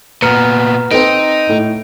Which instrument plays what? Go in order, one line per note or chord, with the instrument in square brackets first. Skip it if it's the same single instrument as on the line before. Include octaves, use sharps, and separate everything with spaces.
[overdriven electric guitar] A#2 B3 [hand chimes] B4 A#5 F6 [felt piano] C#7
[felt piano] C4 A4 B4 [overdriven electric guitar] D#4 [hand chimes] D7
[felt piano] A2